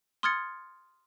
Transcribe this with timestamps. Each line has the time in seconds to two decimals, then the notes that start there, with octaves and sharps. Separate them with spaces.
0.23 C6 D#6 F6 G#6 A6 C#7